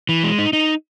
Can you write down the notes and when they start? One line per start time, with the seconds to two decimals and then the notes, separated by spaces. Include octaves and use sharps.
0.09 E3
0.23 G#3
0.38 D#4
0.53 D#4